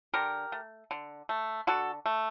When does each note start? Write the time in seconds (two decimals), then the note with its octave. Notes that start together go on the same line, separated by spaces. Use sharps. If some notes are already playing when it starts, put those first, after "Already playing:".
0.14 D3 G4 A#4
0.52 A3
0.91 D3
1.29 A3
1.67 D3 F#4 A4
2.06 A3